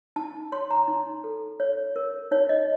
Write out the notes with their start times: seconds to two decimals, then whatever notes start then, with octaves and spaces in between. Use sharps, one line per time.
0.16 D#4 A5
0.52 C#5 C6
0.70 A#5
0.88 D#4
1.24 A4
1.60 C#5
1.96 A#4
2.31 D#4 C#5
2.49 D#5